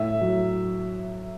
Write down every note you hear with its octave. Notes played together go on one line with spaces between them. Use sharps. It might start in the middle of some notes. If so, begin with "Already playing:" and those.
Already playing: A2 E5
F#3